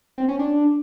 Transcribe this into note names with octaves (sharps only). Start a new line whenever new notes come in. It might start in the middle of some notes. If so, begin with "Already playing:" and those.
C4
C#4
D4